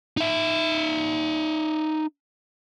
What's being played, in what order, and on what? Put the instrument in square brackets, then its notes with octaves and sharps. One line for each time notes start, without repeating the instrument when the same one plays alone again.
[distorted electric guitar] D#4 E5